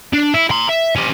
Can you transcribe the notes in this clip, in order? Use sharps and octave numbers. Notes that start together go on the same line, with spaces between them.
D4
E4
A#5 C6
E5
C#4 G4